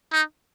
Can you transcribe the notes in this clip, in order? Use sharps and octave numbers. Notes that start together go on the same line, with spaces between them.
D#4